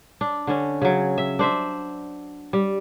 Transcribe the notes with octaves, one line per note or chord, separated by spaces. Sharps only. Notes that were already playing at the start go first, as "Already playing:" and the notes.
D4
D3 C#4
C#3 F#3
E5
D4 C5 E5
G3